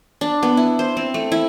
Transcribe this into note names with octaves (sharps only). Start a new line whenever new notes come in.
D4
B3
E4
C5
C4
A3
E4